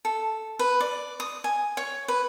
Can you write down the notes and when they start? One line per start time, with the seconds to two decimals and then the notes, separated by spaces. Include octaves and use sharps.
0.05 A4
0.59 B4
0.80 D5
1.20 D#6
1.44 G#5
1.77 C#5
2.08 B4